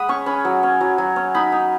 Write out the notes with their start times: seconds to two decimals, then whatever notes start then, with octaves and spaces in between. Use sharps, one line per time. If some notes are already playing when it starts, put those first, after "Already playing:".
Already playing: G#3 F#5 B5 D#6
0.09 C#4 C#6
0.26 C#4 B5
0.45 F#3
0.63 C#4
0.81 F#3
0.98 F#3
1.16 C#4
1.35 D#4 B5
1.52 D#4